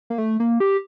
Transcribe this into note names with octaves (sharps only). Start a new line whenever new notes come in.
A#3
A3
A#3
G4